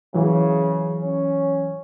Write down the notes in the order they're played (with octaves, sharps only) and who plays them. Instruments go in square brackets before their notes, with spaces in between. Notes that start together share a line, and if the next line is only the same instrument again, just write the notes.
[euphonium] C#3 [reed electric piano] E3 F#3
[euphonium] C#4